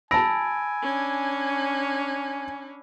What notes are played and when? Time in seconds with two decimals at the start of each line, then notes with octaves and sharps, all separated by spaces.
0.11 G#5 A5 B5 E6 A#6 D7
0.82 C#4 D4